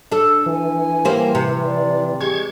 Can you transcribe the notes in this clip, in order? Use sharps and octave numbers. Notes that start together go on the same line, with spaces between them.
D4 A4
E3 G#5
G3 A#3 C5
C3
D5
G#3 G4 C#6 G#6